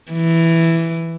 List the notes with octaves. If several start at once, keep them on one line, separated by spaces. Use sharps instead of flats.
E3